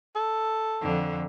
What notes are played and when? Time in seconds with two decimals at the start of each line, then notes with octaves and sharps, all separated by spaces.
0.15 A4
0.81 F2 D3